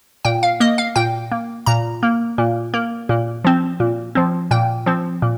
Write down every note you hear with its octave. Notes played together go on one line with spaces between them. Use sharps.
A#2 G5
F5
A#3 D#5
F5
A#2 G5
A#3
A#2 A#5
A#3
A#2
A#3
A#2
F3 C4
A#2
F3 C4
A#2 G5
F3 C4
A#2